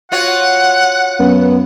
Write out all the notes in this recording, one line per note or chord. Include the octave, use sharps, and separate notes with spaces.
F4 F#4 C#5 F#5
F#2 B3